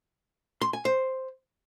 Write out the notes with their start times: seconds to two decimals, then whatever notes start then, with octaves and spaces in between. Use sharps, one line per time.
0.61 C6
0.73 G#5
0.85 C5